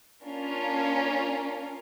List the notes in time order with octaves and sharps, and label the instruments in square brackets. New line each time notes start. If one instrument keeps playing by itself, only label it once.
[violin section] A#3 C#4 D4 F4 A#4